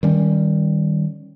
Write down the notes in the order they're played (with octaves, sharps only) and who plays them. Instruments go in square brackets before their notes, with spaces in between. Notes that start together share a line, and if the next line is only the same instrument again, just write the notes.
[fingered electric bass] D#3 G3 C#4